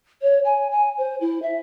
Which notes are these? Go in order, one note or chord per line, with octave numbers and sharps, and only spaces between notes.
C#5
G#5
G#5
C5
E4
E5